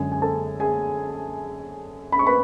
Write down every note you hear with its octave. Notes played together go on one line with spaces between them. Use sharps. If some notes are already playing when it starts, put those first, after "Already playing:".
Already playing: F#2 D3 G#3 G#4 G#5
G#5
A4 A5
G#4 G#5
B5
C#6
B4 B5